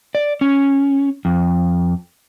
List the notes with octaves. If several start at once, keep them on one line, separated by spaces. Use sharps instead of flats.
D5
C#4
F2